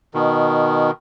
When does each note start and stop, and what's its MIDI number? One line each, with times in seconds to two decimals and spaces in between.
0.14 0.91 47
0.14 0.91 51